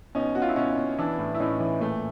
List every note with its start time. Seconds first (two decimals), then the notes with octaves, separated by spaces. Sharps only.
0.15 B2 C#4 D#4
0.35 B2 F#4
0.42 F4
0.49 E4
0.56 B2 C#4 D#4
0.77 B2
0.98 E3 D4 E4
1.19 A2
1.35 E4
1.40 A2 C#4 D#4
1.60 E3
1.81 A#2 A3